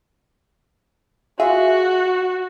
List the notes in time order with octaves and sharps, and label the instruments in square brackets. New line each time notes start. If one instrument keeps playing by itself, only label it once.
[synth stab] F4 G#4 E5 [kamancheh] F#4